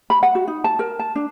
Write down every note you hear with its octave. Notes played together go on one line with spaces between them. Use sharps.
B5
F#5
F#4
D#4
A5
A#4
A5
D4